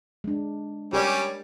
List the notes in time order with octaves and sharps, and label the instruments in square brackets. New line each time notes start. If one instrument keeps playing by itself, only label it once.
[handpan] G#3 D4
[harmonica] G3 C#4 [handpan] G4 A#4 D5